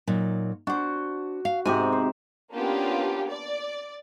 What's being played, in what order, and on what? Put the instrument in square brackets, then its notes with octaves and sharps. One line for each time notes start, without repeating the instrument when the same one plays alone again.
[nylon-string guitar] A#2 F#3 D#4
[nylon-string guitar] D4 C5 [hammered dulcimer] F#4
[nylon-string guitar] F5
[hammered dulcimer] G#2 C3 G4 [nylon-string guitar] F#4 G#5
[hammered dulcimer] C5
[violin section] A#3 B3 C#4 D4 F4 G4
D5